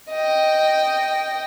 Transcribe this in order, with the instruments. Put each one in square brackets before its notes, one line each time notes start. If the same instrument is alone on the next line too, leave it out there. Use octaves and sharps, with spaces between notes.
[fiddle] D#5 G5